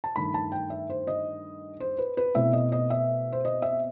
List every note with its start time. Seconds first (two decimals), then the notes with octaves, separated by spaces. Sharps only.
0.04 A5
0.16 G2 D#3 A3 B5
0.34 A5
0.52 G5
0.70 E5
0.90 C5
1.07 D#5
1.80 C5
1.98 B4
2.17 B4
2.34 B2 A3 C4 E4 E5
2.53 D#5
2.72 D#5
2.90 E5
3.32 C5
3.45 D#5
3.62 E5